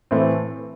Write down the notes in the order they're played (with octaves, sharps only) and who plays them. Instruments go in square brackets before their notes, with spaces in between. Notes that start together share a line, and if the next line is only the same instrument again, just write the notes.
[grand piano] A2 E3 A3 C4